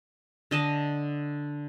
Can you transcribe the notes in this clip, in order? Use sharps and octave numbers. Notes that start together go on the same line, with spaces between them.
D3 D#5 A5